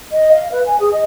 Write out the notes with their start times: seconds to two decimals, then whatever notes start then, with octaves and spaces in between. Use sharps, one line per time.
0.12 D#5
0.32 F5
0.51 B4
0.66 G#5
0.80 G#4
0.92 D#5